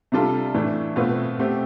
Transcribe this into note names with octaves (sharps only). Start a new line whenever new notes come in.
C3 G3 D4 F4 A4
A2 E3 A3 D4
B2 A3 C4 F4 B4
B2 A3 C4 G4